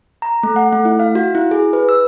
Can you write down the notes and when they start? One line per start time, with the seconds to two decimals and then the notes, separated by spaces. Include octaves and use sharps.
0.22 A#5
0.43 A3
0.56 F#5
0.73 A3
0.85 E4
1.00 F5
1.15 F#4
1.35 E4
1.51 G#4
1.73 B4
1.89 E6